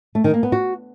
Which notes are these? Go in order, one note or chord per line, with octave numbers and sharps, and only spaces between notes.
A3
D#3
A#3
B3
F#4